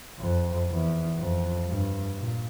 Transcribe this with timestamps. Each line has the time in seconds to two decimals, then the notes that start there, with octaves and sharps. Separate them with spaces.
0.20 F2
0.70 E2
1.18 F2
1.68 G2
2.18 A#2